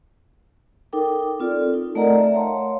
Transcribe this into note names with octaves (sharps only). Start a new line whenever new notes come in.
D#4 A4 A#4 G5 D6
C4 F4 A4 D5
D#4
A3 A#4 D5 D#5 F#5 A#5
D5 E5
C#5 F5 F#5 A5 C6